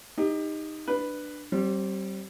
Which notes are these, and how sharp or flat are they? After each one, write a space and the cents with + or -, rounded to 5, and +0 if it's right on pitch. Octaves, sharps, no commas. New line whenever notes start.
D#4 +0 G4 +25
D4 +15 B4 +0
G3 -25 C4 +25